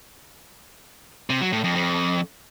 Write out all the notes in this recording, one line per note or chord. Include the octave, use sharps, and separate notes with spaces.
C3
F#3
A2
F2
F2